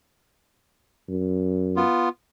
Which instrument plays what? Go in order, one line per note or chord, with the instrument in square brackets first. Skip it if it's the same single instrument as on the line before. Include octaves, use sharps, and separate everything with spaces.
[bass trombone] F#2
[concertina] B3 F4